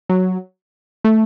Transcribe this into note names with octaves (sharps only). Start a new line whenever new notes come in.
F#3
A3